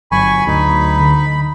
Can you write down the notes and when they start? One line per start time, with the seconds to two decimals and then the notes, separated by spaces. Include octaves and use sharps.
0.12 G1 F#3 G#5 B5 C#6
0.47 D2 D#4
1.00 D3